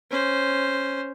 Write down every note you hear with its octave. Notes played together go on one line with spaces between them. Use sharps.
C#4 C5